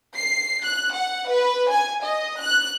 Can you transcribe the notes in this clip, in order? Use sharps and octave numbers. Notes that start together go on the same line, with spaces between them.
C7
F#6
F#5
B4
G#5
D#5
F#6